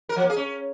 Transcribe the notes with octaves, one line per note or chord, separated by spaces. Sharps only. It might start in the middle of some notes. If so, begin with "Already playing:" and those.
A#4
F3
A#3
G#4
C#4